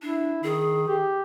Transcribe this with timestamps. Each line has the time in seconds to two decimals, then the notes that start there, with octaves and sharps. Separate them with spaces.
0.02 D4 E4
0.44 D#3 G#4
0.88 G4